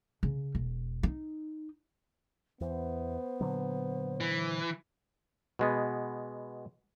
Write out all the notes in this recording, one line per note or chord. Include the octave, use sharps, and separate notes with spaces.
C#3
E1
D#4
E2 B3 C5
A#2 D3 F#3
E3
B2 G#3 B3